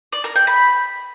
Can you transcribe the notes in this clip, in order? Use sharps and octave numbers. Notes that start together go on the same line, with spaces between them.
D5
A#4
G5
B5